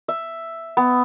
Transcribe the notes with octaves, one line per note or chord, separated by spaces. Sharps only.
E5
B3